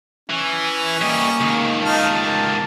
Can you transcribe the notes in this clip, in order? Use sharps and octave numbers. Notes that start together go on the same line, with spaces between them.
E3 C#4
G3 A#3 D#5
C#2 D#3
D#4 F4 A5 F6
A#3